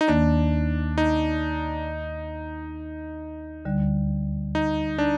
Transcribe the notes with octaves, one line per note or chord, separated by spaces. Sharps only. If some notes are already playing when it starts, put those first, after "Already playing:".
D#4
D#2 D#3 A#3 D4
D#4
D2 D3 G3
D#4
D4